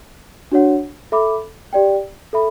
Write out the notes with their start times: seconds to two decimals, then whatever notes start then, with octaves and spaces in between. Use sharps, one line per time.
0.52 D4 F#4 C#5 F#5
1.12 A4 E5 B5 D6
1.73 G4 D5 G5
2.33 A4 E5 B5